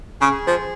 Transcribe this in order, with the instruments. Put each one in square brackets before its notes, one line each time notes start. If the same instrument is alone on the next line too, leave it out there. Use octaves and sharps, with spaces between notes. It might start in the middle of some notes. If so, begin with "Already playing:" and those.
[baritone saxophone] C#3 [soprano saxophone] G#4
[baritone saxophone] F3